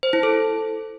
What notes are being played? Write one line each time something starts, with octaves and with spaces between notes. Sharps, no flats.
C5
E4
A4